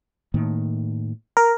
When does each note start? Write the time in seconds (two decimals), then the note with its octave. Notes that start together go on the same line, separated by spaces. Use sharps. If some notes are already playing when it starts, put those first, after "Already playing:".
0.34 A2 D#3 A#3
1.37 A#4